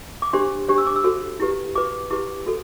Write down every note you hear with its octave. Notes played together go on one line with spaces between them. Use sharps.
D6
D4 G4 C5 C6
D4 G4 C5
E6
D6
E6
F#4 A4 C5
E4 G4 B4
F#4 B4 D6
E4 G4 B4 D6
F#4 A4